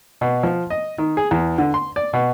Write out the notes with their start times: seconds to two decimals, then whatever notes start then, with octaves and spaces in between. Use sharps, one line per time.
0.21 B2
0.43 F3
0.70 D#5
0.98 D#3
1.17 G#4
1.31 E2
1.58 D3
1.74 C6
1.96 D5
2.13 B2